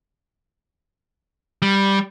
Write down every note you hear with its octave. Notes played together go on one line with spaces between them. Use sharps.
G3